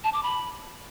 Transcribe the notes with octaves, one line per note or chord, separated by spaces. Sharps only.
A5
D6
B5